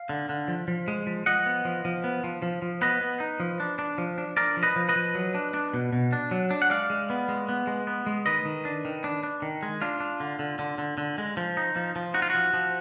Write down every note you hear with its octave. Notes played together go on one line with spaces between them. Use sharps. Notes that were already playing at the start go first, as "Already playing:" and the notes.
Already playing: F5
D3
D3
F3
F3
G#3
F3
F3 D#5 F#5
B3
F3
F3
B3
F3
F3
F3
B3 B4 D#5
B3
D#4
F3
D4
D4
F3
D4
D4 A#4 D5
F3
B4 D#5
F3
B4 D#5
F3
F#3
D4
D4
B2
B2
D4
F#3
D4
F#5
G#3 D5 F5
G#3
B3
G#3
B3
G#3
B3
G#3
D#3 B4 D#5
D#3
D4
D#3
D4
D4
D#3
G#3
D4 F4
D4
D3
D3
D3
D3
D3
G#3
F3
D#4
F3
F3
D#4 F#4
F4
F3 F#4
F3